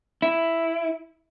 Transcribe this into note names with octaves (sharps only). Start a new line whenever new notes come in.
E4